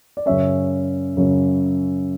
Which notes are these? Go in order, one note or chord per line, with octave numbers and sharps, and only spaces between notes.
D5
F#2 C#3 F#3 C#4 C#5 E5
F#2 C#3 F#3 C#4